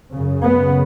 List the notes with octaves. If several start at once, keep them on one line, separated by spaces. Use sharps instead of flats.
F#2 C#3
B3